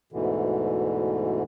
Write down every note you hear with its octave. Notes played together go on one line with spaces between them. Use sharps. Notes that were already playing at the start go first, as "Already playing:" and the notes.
D2 G#2 B2 D3 E3